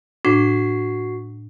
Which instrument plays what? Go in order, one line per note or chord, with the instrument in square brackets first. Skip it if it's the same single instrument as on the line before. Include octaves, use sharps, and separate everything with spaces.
[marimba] A2 D4 [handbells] F#4 C7